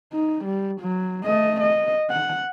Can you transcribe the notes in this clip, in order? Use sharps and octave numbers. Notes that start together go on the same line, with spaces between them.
D#4
G3
F#3
A3 D#5
D#5
F#5